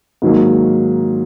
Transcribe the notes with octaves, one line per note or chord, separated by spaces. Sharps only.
G#2 D#3 F#3 A#3